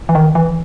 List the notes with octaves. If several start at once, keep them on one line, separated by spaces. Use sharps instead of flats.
E3
D#3
E3